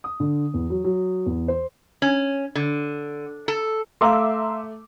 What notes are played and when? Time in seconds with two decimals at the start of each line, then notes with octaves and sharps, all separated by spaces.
0.04 D#6
0.20 D3
0.54 E2
0.70 F#3
0.84 F#3
1.26 E2
1.48 C5
2.02 C#4
2.55 D3
3.48 A4
4.01 A3 E5 F5 A#5 C6 D6 E6